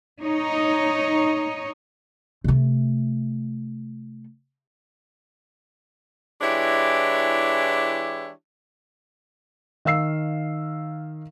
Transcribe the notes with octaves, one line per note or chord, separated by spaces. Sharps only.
D#4 C#5 D#5
C3 A3
E3 G#3 D4 E4 G4 C#5
D#3 F5 E6 C7